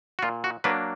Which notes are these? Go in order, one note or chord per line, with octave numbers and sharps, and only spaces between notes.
F#4
A#2 F4
F#4
F#3 A#3 D4 B4